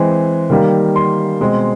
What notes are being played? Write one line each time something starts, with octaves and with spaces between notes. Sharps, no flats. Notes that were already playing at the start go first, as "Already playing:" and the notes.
Already playing: E3 G#3 C4
D#3 G3 A#3
C6
B2 G#3 C4